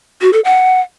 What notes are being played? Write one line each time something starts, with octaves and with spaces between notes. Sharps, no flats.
F#4
A4
F#5